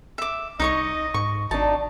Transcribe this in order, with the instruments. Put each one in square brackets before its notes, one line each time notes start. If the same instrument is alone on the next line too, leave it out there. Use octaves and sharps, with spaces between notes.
[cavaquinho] E5 D6
[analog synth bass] C2 [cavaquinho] D#4 C#5 C#6 [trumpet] D#5
[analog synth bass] G#2 [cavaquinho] C#6
[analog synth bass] G#1 [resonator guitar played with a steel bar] D4 F#4 [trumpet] D#4 [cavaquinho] A5